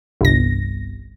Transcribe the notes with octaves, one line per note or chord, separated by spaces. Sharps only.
G1 C2 A#6